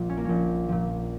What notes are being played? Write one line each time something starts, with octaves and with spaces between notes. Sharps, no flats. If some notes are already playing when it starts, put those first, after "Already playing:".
Already playing: A#1 A#2 F3
C#4
A#3
A#1 C#4
A#2 F3